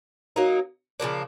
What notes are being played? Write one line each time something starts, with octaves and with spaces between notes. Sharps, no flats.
F#3 A#3 D#4
C#3 F3 A#3 D4